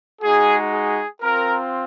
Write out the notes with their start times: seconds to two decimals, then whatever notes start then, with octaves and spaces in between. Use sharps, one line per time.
0.22 G#3 D#4 F#4 G#4
0.73 G#4
1.22 C4 F4 A#4